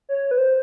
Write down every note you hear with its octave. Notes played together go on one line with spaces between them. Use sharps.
C#5
B4
C5